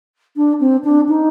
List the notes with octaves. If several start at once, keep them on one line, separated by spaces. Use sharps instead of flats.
D4
C4
D4
D#4